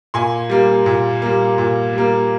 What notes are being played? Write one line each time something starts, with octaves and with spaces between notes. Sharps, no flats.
A#2 G#5 C6
G3 A#3
A#2
G3 A#3
A#2
G3 A#3